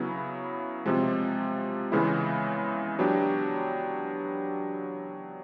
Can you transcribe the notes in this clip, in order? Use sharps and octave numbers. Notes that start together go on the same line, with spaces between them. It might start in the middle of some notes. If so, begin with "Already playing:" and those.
Already playing: C#3 F#3 B3 E4
C3 F3 G#3
C#3 E3 G#3 B3 E4
F#3 B3 D4 G4